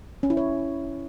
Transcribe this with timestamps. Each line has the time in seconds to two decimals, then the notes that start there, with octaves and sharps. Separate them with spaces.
0.23 C#4
0.30 E4
0.37 C#5